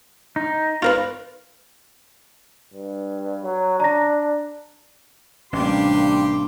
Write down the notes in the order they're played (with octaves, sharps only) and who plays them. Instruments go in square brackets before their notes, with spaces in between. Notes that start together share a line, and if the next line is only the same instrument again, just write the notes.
[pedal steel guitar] D#4
[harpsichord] F4 A#4 B4
[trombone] G2
F#3
[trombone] D4 [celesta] A#5 A#6
[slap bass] A1 C#4 [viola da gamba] C3 G3 D4 [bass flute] A#3 [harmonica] G4 C6